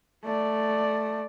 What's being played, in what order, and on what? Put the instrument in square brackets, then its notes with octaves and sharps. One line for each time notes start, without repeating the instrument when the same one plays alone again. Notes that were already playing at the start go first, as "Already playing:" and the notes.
[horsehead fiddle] A3 D5